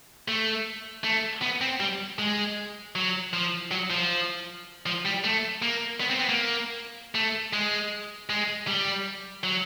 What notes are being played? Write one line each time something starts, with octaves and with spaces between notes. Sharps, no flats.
A3
A3
B3
C4
G3
G#3
F#3
F3
F#3
F3
F3
G3
A3
A#3
B3
C4
B3
A#3
A3
G#3
G#3
G3
F#3